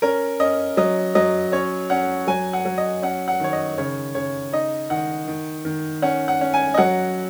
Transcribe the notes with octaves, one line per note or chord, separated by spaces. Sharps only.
C#4 A#4
C#4 D#5
F#3 D#5
F#3 D#5
C#4 C#5
C#4 F#5
F#3 G#5
F#5
F#3
D#5
C#4 F#5
F#5
D#3 C#5
D#5
C#3 C#5
C#3 C#5
D#4 D#5
D#3 F#5
D#3
D#3
C#4 F#5
F#5
C#4
G#5
D#5
F#3 F#5